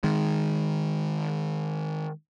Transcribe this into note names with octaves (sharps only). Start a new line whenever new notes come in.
D#3 G#3